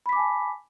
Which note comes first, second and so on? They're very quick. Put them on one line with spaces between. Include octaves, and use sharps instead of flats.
B5 B6 D6 G#5 A5